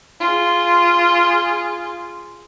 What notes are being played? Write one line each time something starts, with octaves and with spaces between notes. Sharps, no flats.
F4 G#4